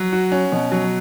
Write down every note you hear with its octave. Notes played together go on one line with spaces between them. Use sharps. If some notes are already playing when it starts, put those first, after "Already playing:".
Already playing: F#3
F#4
C#4
B2
F#3